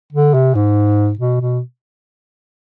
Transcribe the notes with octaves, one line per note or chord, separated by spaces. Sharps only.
D3
C3
G#2
B2
B2